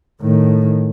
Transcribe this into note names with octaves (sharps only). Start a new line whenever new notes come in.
A2 D#3